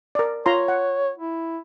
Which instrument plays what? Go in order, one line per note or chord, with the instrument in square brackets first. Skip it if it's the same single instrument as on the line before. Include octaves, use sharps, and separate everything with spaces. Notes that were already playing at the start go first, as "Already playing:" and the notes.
[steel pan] A#4 D5
[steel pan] F4 A#5 C6 [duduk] C#5
[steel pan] F#5
[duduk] E4